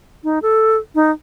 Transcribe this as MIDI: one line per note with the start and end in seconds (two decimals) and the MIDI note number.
0.24 0.39 63
0.42 0.77 69
0.95 1.11 63